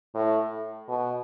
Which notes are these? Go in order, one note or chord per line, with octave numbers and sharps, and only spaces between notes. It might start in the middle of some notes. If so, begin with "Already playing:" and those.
A2
B2